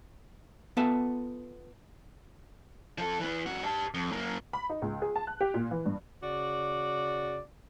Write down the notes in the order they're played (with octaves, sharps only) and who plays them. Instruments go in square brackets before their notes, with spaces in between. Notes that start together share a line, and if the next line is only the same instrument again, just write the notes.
[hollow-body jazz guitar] B3 F4 A4 E5 G#5 A5
[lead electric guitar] F3 A4
E3 B3
G2 F#4
G4 A5
F2
F#2 A#3
[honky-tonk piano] B5
D#4
C#2
G#4
A5
F#6
G4
A#2
E3
G2
[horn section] C#3 F#4 D5